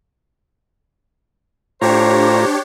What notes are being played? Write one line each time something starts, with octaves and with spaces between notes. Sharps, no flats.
A2 D4 F4 G4 C5 C#5 A#5